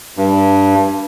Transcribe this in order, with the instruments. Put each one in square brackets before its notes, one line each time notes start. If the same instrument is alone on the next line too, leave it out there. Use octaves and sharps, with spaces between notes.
[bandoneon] G2